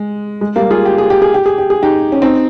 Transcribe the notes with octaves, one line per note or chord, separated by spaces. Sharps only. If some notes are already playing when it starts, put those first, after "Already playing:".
Already playing: G#3
G#3
G3 A#3
F4 G#4
G4
G#4
G4
G#4
G4
G#4
G4
G#4
D#4 G4
C#4
C4 D#4